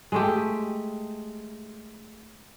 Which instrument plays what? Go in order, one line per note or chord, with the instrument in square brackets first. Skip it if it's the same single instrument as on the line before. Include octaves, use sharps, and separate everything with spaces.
[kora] G#3 A3 G4